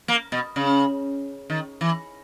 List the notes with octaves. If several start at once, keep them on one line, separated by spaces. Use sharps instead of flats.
A#3
B2
C#3
D#3
E3